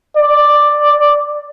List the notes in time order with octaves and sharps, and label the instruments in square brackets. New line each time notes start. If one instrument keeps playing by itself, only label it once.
[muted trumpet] D5